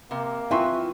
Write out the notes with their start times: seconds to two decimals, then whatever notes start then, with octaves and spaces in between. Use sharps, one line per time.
0.11 C3 A#3
0.51 C4 E4 F4 B4 E5 G#5 C6 C#6